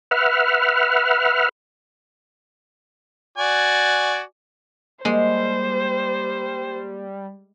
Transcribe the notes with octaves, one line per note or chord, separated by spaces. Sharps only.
B4 E5 F#5 F6
F#4 D5 G#5
G3 G#3 A#3 C5